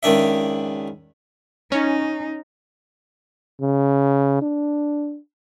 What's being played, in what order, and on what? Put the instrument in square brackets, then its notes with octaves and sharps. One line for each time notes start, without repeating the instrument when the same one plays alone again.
[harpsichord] C#2 D#3 D4 E5
[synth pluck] C#4 [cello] D#4
[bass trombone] C#3
D4